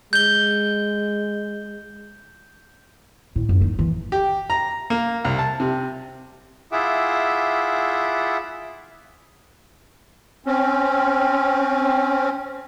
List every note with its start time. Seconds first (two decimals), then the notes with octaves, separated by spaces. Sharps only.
0.13 G#3 G6 G7
3.36 A2
3.49 F#2
3.61 D#4
3.79 E3
4.12 G4
4.50 A#5
4.90 A#3
5.25 C2
5.39 A5
5.60 C3
6.72 E4 F4 G#4 E5 F#5 D6
10.46 C4 C#4